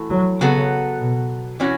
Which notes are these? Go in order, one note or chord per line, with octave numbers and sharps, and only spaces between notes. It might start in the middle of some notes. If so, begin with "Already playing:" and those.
Already playing: E3 A3 F#4
F#3
C#3 F#3 B3 F#4 A4
B2
E3 C#4 F#4